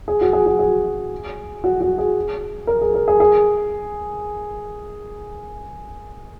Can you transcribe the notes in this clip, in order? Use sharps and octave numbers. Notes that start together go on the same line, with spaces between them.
G#4
F#4
G#4
F#4
G#4
F#4
F#4
G#4
A#4
G#4
A#4
G#4
G#4